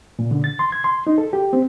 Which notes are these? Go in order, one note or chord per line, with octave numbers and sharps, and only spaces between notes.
A#2
D3
A6
C6
G#6
C6
D#4
A4
G4
C4